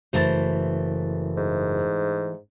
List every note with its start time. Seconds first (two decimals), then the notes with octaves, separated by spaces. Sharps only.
0.13 F#1 E3 A3 C5 A6
1.37 G#2